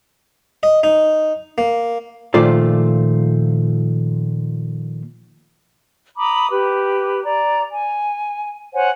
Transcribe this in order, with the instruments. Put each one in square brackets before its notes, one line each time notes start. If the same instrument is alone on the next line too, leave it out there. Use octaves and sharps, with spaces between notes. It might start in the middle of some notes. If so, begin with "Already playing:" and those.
[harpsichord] D#5
D#4
A#3
[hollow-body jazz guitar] A#2 D#3 F3 A3 F4 D5
[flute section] A#5 B5 D6 D#6
G4 B4
D5 A#5
G#5
C5 C#5 F#5 G#5